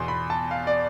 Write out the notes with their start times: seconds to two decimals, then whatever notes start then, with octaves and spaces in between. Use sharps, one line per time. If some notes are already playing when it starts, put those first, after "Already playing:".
Already playing: E2 B2 C6
0.08 B5
0.30 A5
0.51 F5
0.67 D5